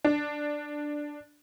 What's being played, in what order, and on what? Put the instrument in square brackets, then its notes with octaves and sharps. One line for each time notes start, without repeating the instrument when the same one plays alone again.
[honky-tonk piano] D4